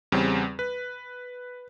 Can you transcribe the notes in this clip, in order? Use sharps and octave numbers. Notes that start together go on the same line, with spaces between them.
E2 C#3 G3 C4
B4